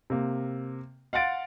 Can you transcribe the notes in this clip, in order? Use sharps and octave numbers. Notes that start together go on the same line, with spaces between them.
C3 A#3
F5 F#5 C6 A6 D7